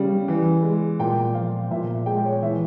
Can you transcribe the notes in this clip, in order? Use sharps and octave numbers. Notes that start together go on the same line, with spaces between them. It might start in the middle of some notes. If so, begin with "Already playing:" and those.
Already playing: C#3 G3
E3
G#3
A#2 G5
F3 F5
A#2 E5
G#3 G5
C#5
E3 E5